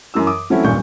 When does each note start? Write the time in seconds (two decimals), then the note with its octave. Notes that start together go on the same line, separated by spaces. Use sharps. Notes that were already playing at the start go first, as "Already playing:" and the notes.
0.14 F#2 E3 E6
0.27 D6 D#6
0.50 E3 F#3 A3 C4 C#4 E4
0.64 D#1 B1 G2 A#2 C#6 G6